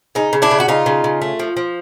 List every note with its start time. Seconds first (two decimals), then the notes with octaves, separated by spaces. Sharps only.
0.15 C#3 D#4
0.33 C#3
0.42 D4 E4
0.51 C#3
0.60 F#4
0.68 C#3 D#4 F4
0.86 C#3
1.04 C#3
1.22 A3
1.39 F3
1.57 F3